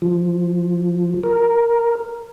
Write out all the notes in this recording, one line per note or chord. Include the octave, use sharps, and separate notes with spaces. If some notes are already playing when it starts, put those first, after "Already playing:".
F3
A#4